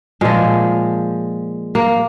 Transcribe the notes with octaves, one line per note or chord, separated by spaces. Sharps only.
A#2 F3 G#3
A#3